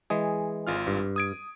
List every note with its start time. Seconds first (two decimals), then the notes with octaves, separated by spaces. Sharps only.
0.10 E3 G#3 G#4
0.67 G#1 F4 F6
0.87 G2
1.16 D#6 G#6 D7